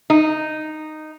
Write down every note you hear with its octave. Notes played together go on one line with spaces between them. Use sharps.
D#4